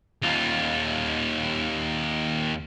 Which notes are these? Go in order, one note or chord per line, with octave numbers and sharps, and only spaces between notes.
D#2 F4